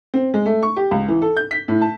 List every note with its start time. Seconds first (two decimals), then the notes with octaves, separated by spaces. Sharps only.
0.14 C4
0.34 G#3
0.46 A3
0.63 C#6
0.77 G4
0.91 C#2
1.08 E3
1.22 A4
1.37 G6
1.51 B6
1.68 A2
1.81 A5